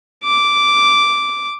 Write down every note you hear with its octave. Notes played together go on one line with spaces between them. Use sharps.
D6